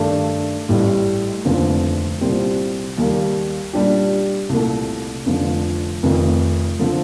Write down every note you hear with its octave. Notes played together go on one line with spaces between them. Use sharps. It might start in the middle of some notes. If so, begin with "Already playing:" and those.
Already playing: G2 D#3 A3 D4
A1 A2 G3
F1 D#2 D3 F3 C4
C2 A#2 G3 C4
D#2 D#3 G3 A#3
A#2 G3 D4 G4
C2 A#2 A3
F1 F2 D3 F3
F1 F2 D#3
D3 F3 A3 C4